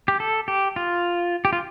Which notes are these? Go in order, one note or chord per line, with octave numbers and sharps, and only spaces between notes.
G4
A4
G4
F4
G4
F4